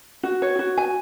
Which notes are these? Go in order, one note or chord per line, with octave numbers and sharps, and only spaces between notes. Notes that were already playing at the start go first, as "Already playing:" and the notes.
F#4
C#5
F#4
G#5